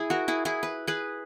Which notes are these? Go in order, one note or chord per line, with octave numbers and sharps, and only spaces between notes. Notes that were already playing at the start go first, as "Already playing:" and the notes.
Already playing: E4 G#4
F#4 A#4
E4 G#4
E4 G#4
B4
G#4 B4